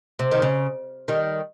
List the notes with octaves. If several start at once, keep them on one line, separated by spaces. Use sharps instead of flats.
C3
D#3
C#3
D#3 G3